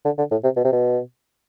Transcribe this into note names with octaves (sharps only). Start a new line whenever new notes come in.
D3
D3
A2
C3
B2
C3
B2